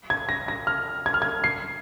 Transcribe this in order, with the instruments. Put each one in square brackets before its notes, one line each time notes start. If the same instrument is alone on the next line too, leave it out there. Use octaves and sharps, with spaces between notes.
[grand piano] G#6
A#6
A#6
F6
G#6
F6
G#6
C7